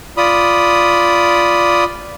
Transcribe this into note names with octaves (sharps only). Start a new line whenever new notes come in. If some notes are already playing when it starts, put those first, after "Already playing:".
F4 D5 B5 D#6